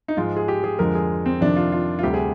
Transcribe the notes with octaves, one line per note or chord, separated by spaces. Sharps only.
D#4
G#2 F3 G#3 F4
G#4
G4
G#4
F2 D3 F3 G#3 A#4
G#4
C4
F2 C3 D#3 D4
F4
F4
F4
D2 C3 G3 G4
G#4